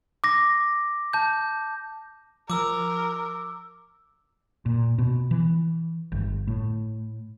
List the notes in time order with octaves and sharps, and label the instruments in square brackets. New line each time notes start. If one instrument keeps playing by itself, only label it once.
[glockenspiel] D6 A#6
A5 G6
[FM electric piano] F3 [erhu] A#4 [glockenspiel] D6 E6
[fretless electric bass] A#2
B2
E3
G1
A2